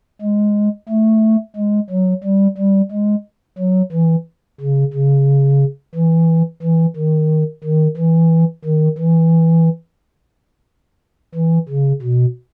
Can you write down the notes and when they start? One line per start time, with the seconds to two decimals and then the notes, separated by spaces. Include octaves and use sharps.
0.22 G#3
0.89 A3
1.56 G#3
1.90 F#3
2.24 G3
2.58 G3
2.92 G#3
3.59 F#3
3.92 E3
4.60 C#3
4.93 C#3
5.95 E3
6.62 E3
6.96 D#3
7.64 D#3
7.97 E3
8.64 D#3
8.98 E3
11.35 E3
11.69 C#3
12.02 B2